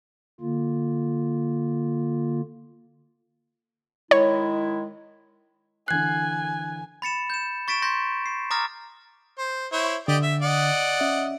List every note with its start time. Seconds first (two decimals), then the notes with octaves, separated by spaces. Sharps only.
0.41 D3 A#3 F4
4.11 D#3 G#3 E4 C#5
5.88 D3 E3 G#5 F#6 G#6 C7
7.02 B5 A6 C#7 E7
7.30 G6 E7
7.68 C#6 A6 B6 D7 E7
7.82 C6 G6 A#6
8.26 C7
8.51 A#5 D6 D#6 F6 A6 A#6
9.39 C5
9.73 E4 C5 C#5
10.08 D3 G4 D5 D#5
10.22 E5
10.42 D5 D#5 F#5
11.00 C#4 E5